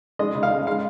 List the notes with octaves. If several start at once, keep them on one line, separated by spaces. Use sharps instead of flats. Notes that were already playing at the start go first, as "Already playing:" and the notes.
G#3 D#5
C#3
F5
G#3
G#3 F5